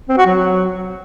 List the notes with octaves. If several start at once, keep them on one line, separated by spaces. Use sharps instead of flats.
C4
F#4
F#3